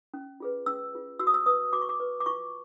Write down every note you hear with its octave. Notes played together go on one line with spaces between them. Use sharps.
C#4
F4 G#4 B4
C#4 E6
F4 G#4 B4
F#4 E6
D#6
E6
B4 D#6
F#4 D6
C#6
D6
B4
D6
F4 C#6